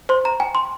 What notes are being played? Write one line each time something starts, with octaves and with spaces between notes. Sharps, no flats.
C5 C6
A#5
G5 G#5
C6